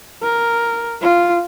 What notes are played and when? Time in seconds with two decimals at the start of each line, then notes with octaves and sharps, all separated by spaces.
0.23 A#4
1.01 F4